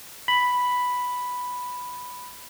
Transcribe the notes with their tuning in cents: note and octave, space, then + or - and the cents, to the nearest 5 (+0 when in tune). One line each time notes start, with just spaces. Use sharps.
B5 +0